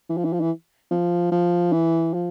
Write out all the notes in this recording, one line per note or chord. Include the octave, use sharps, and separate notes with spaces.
E3
F3
E3
F3
E3
F3
F3
E3
F3